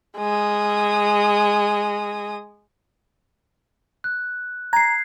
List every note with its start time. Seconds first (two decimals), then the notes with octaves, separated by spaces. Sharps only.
0.18 G#3 D#6
4.04 F#6
4.73 A#5 G#6 C7